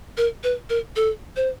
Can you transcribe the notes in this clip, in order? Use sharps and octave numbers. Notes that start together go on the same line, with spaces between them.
A#4
B4
A#4
A4
C5